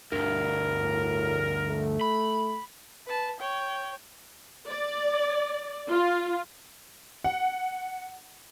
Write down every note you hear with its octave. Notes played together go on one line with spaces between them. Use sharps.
D2 G2 A#4
A2
A3
B5
B4 A5
C#5 G5
D5
F4
F#5